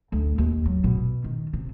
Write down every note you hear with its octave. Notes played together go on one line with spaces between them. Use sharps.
D2
D#2
F#3
B2
D#3
C3